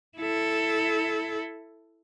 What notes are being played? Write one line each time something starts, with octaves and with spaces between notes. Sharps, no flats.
E4 A4